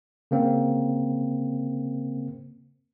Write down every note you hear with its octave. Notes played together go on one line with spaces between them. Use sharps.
C#3 A#3 C4